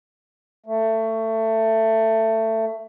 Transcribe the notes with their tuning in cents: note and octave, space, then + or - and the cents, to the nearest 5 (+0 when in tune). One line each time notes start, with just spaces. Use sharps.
A3 +20